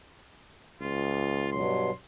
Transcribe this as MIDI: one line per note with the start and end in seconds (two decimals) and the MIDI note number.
0.81 1.63 37
0.81 1.49 65
1.52 1.91 43
1.52 1.91 47
1.52 1.91 54
1.52 1.92 84